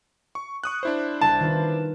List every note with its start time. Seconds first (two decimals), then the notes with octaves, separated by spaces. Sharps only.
0.35 C#6
0.64 C#6 D#6 F#6
0.83 D4 E4 C5
1.21 C2 A5
1.40 D#3 B3 F4